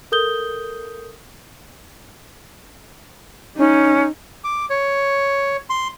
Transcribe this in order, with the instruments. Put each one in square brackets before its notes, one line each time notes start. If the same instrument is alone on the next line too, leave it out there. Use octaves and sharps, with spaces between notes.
[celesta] A4 A#4 D#6 G6 G7
[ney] C#4 [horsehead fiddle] D#4
[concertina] D6
C#5
C6